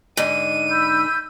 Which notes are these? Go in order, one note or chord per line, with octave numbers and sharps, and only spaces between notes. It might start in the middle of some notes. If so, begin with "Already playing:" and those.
G#2 D3 D#7
B5 E6 G6